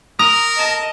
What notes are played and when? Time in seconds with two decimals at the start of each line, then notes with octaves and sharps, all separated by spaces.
0.19 A#4 A#5 D#6
0.56 D#5 A5